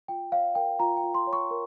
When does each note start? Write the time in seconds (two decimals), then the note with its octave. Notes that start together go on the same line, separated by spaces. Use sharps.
0.08 F4 G5
0.32 C#5 F5
0.55 A#4 G5
0.79 F4 A#5
0.97 G5
1.04 F4
1.15 C6
1.27 C#5
1.33 C#6
1.51 A#4